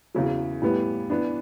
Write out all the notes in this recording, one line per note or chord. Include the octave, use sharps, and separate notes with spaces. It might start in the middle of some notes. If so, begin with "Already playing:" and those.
E2 C#3 F#3
A2 E3 G3 B3
E3 B3 D4